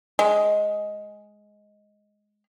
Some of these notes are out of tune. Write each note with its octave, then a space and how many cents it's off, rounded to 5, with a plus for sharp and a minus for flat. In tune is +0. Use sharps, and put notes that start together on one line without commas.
G#3 +5